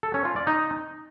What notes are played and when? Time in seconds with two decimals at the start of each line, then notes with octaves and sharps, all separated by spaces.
0.03 A4
0.14 C#4
0.25 F4
0.36 D5
0.47 D#4